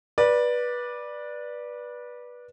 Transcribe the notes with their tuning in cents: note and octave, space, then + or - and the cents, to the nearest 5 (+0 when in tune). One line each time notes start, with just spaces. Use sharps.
B4 -20 D5 +5